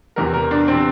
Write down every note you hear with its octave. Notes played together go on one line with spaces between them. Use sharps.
E2 C3 E3 A#4
A#4
D4
C3 E3 C4